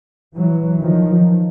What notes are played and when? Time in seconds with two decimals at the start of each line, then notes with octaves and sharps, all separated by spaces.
0.37 E3 F#3
0.81 D#3 F3